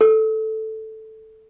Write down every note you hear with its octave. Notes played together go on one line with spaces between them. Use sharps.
A4